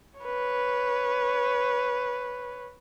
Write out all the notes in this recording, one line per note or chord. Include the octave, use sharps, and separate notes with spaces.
B4 C#5